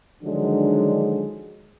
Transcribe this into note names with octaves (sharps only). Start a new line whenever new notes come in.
D3 D#3 F3 F#3 G#3 D4